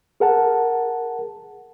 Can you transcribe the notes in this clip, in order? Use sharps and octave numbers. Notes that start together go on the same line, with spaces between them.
G#4 A#4 F#5 A5